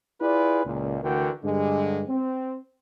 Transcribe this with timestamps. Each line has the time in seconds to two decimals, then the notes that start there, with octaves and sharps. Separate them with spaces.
0.21 E4 F4 G#4 B4 D5
0.66 C#2 A#2
1.03 D2 D3 E3 F#4 A#4 G5
1.44 G2 D3 G#3
2.08 C4